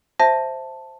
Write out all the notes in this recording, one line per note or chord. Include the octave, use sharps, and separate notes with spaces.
C5 E5 A5 A#6